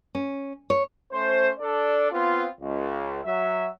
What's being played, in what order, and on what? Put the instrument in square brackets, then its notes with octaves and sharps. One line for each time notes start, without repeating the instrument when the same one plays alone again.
[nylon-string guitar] C#4
C#5
[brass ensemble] A3 C#4 C5
D4 A4 D5
B3 C4 F4
C#2
F#3 E5